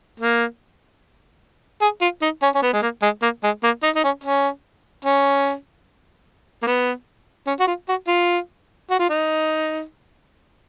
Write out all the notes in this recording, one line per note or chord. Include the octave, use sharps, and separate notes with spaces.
A#3
G#4
F4
D#4
C#4
C#4
B3
G#3
A#3
G#3
A#3
G#3
A#3
D#4
D#4
C#4
C#4
C#4
A#3
B3
C#4
F#4
F4
F#4
F4
F#4
F4
D#4